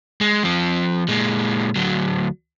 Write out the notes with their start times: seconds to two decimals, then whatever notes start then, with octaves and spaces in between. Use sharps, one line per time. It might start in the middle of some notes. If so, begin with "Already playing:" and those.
0.21 G#3
0.43 F3 C4
1.08 A#2 G#3
1.76 D2 F#3